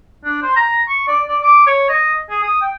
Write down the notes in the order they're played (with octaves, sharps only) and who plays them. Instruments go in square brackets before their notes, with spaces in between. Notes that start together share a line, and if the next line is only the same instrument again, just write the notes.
[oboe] D4
C5
A#5
C#6
D5
D5
D6
C#5
D#5
G#4
D#6
G5